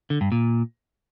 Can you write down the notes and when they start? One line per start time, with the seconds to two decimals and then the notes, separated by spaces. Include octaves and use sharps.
0.10 D3
0.21 G2
0.32 A#2